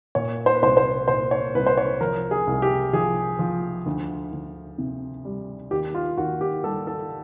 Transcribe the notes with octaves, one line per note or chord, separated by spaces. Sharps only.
A#2 C#5
C5
B4
C2 C5
C5
A#2 C5
C#5
C2 B4
C5
C#5
F3 A#4
G#4
C2
G4
F3 G#4
F3
D2
D2
C3
G3
D#2 G4
F4
D#2 F#4
G4
G3 A4
A4